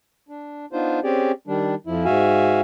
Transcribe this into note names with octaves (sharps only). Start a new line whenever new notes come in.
D4
B3 D4 D#4 F4 C5
C4 C#4 G4 G#4 D5
D#3 G3 D4
F2 F3 E4
G#2 F#4 E5 F5 G#5